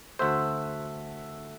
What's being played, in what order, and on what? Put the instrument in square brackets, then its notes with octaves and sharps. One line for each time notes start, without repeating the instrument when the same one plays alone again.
[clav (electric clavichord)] D2 C5 [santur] A3 E5 F#5